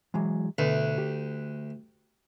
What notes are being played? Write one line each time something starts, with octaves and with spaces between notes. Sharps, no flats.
E3 F#3 G#3
D2 B2 B4 E5
G4